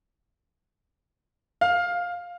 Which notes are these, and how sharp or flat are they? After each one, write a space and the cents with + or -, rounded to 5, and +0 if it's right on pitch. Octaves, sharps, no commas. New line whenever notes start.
F5 +10